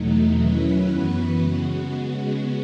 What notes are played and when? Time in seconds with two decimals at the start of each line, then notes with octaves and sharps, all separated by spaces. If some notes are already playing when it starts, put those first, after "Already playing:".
Already playing: E2 B2 F#3 A3 D#4
0.38 D#3 F#3 C#4 E4 B4
0.88 F#2 E3 B3 F#4 B4
1.38 C#3 G#3 B3 F#4